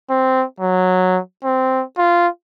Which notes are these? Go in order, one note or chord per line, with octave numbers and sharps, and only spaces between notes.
C4
F#3
C4
F4